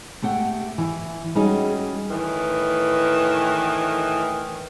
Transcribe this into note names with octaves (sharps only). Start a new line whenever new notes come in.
A3 G4 F#5 G5
E3
G3 C#4 D#4 F#4 G#4
A2 D#3 E3